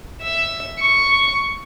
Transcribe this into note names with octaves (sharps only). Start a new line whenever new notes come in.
E5
C#6